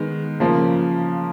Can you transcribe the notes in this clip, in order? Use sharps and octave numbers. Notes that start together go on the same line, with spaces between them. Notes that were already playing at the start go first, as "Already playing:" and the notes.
Already playing: D#3 G#3 B3
C#3 F3 A#3